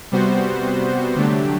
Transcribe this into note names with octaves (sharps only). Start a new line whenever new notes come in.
C3 G3 B3 F#4 C5
D3 F#3 A3 D4 G4